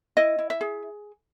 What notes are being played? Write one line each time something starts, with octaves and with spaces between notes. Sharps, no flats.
E4 D#5
E4
E5
G#4